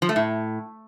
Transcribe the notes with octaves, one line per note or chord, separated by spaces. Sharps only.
F3
A3
A2